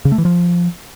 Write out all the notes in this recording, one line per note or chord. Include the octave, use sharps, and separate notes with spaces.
C#3
A3
E3
F3